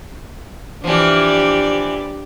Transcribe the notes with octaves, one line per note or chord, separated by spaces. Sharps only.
E3 F3 D4 G4 D5